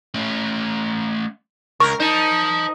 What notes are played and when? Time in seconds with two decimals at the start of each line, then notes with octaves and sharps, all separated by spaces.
0.14 A3 C#4
1.80 C#2 A#4 C#6
2.00 D#4 C5 A5